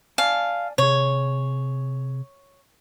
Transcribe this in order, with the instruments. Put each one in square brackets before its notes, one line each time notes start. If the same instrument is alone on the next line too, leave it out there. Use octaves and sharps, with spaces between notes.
[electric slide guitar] D5 G#5 A5 [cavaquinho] F5
[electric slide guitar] C3 G#4 [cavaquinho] C#5